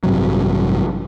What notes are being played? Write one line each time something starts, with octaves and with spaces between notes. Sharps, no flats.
A1 G2 C3 F#3